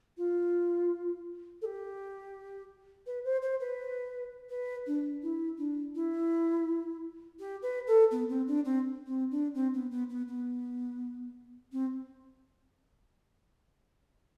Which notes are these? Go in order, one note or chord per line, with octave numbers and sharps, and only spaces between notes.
F4
A4
G4
B4
C5
C5
B4
B4
D4
E4
D4
E4
G4
B4
A4
B3
C4
D4
C4
C4
D4
C4
B3
B3
B3
B3
C4